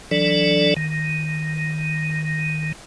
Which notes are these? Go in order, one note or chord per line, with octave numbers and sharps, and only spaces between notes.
E3 F#3 D4 A4 D5
D#3